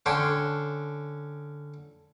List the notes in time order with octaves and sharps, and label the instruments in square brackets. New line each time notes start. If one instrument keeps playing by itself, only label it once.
[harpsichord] D3 C#4 G5 C6